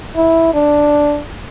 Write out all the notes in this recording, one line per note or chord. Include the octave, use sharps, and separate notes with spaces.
E4
D4